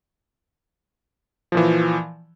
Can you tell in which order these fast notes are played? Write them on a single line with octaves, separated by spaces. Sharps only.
F3 A#2 E3